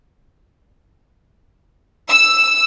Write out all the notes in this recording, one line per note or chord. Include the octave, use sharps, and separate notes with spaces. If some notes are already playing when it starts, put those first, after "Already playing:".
E6